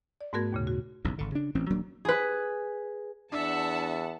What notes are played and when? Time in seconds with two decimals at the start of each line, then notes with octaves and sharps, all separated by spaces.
0.21 D5
0.33 G#2 A3 B3 F#4 A#4 G#6
0.52 D#2 A#2 C#3
0.67 F#4
1.05 F#1 B1 E2 C#3
1.18 G#1 D3
1.32 C#3 D4
1.55 A1 E3 C4 C#4
1.70 D#1 F#3 A#3 D4
2.05 G#4 B4
3.32 E2 D4 E5 F#5 A5